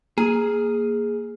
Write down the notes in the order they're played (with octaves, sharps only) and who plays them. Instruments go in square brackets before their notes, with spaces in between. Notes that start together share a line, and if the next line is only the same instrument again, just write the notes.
[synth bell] A#3 [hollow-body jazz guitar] G#4